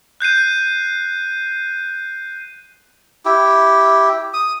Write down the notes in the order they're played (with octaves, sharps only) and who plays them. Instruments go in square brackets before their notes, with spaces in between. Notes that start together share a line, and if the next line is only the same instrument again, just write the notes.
[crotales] F#6 G6 C7 D#7
[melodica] E4 G4
D#6